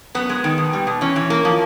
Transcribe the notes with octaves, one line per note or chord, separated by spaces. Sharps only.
F#2 B3
G#3
D#3
B2
G3
B2
E3 C#4
E3
A#3
F3